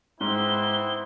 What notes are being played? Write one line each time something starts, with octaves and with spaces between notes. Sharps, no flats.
G#2 B3 C4 E4 G7